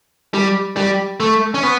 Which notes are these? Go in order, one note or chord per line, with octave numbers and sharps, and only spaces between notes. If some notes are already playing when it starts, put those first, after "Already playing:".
G3
G3
A3
C#4
B3